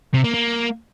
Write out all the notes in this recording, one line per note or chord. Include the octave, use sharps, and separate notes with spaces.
C3
A#3
A#3